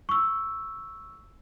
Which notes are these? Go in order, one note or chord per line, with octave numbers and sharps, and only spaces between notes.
C#6 E6